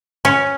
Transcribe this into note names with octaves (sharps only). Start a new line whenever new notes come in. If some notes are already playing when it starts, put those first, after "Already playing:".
C#4